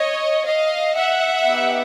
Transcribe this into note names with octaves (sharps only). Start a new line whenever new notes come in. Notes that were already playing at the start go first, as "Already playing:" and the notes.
Already playing: C#5 D#5
D#5 F5
E5 F#5
B3 D#4 G4